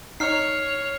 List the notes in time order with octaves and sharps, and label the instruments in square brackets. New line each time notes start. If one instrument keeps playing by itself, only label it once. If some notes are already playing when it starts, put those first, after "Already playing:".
[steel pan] D#4 [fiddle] C#5 [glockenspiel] F6 C7